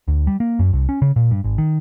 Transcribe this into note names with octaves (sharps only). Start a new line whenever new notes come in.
D2
G3
A#3
F#2
C2
C#4
C#3
A#2
G2
G#1
D#3